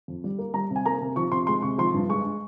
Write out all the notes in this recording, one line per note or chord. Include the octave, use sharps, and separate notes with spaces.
F2
G3
A#3
G3 A#5
C3
G#5
A#3 A#5
C3
F3 C#6
C3 C6
G#3 C6
C3 C#6
F3 C6
G2
G#3 C#6